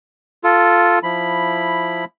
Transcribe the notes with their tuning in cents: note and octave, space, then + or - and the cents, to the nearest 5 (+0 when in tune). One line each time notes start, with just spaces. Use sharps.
F4 +0 A4 +0
F3 +0 E4 +0 B5 +0